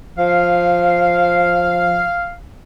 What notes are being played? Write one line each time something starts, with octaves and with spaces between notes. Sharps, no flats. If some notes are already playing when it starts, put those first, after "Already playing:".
F3 F5